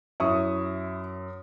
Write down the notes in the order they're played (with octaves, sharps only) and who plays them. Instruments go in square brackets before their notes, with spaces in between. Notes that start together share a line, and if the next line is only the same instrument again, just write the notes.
[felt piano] F#2 [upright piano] E4 C#6 D#6